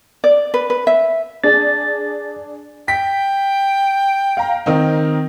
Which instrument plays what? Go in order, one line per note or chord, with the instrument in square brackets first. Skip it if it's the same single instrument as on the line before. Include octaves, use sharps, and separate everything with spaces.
[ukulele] D5
B4
B4
E5
[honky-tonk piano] D4 G#4 [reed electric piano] A6
[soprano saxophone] G5 [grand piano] B6
[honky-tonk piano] F5 A#5
[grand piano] D#3 D#4 [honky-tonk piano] C4 A#4